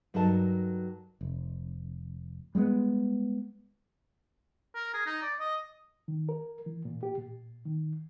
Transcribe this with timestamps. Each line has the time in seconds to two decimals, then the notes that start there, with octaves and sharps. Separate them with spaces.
0.14 G2 F#3 D#4 A4 A#4 A5
1.21 F1
2.55 G3 G#3 A#3 B3
4.75 A#4
4.94 G#4
5.06 D#4
5.22 D5
5.40 D#5
6.08 D#3
6.29 A#4
6.66 E3
6.85 A#2
7.03 G4
7.18 A#2
7.65 D#3